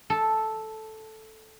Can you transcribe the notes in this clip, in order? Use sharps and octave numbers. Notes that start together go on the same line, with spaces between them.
A4